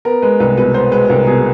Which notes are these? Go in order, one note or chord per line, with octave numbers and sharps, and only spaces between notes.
B3 A#4
G#3 B4
C2 B4
B2 B4
B3 C5
G#3 B4
C2 A#4
B2 G#4